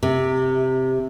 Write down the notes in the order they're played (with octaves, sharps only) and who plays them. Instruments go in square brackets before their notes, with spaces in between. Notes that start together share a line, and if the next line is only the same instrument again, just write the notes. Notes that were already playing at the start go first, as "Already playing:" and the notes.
[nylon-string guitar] C3